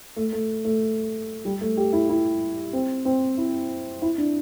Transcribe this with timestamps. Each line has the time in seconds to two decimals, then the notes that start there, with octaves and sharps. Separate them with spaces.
0.16 A3
0.33 A3
0.65 A3
1.45 G3
1.61 A3
1.77 G4
1.93 E4
2.09 E4
2.73 C4
3.05 C4
3.38 E4
4.02 E4
4.18 D4